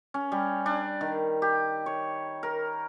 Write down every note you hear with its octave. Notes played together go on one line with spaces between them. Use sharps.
C#4
G3
D4
D#3
G4
C#5
A#4